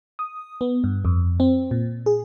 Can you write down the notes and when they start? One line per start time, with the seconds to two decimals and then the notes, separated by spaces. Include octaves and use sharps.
0.19 D#6
0.61 B3
0.84 G2
1.05 F2
1.40 C4
1.71 A#2
2.06 G#4